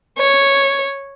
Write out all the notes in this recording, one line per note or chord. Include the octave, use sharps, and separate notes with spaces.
C#5